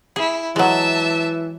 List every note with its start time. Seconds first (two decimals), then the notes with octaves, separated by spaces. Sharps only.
0.16 E4 G#4
0.56 E3 F#3 G#3 E5 A5